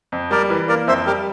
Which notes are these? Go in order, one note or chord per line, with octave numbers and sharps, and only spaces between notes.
F2
G3 A#4 D5
E3
A#3 A#4 D5
F2 C5 E5
G3 G4 A#4